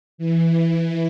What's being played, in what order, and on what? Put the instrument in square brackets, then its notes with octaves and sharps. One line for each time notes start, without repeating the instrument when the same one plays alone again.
[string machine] E3